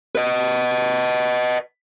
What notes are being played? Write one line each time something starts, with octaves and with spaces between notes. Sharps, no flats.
B4 D#5